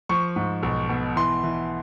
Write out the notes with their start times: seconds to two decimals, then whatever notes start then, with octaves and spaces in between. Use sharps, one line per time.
0.09 F3 C#6
0.36 G#2
0.63 B1
0.89 B2
1.16 E3 C6
1.43 E3